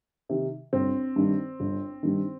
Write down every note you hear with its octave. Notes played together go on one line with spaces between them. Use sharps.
C3 D#3
G1 C4
G2 D#3
G1
G2 D#3